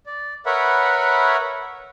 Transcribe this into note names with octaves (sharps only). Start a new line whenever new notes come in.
D5
A#4 B4 C#5 E5 F#5 B5